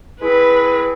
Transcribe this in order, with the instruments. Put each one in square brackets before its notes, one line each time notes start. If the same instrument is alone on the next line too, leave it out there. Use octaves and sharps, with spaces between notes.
[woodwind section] G#3 C4 E4 [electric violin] B4